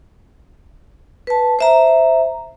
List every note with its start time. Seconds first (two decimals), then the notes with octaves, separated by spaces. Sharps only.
1.27 B4 A5
1.59 C5 E5 A#5